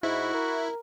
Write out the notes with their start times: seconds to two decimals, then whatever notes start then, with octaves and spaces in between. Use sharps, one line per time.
0.03 G#2 E4 F#4
0.34 A#4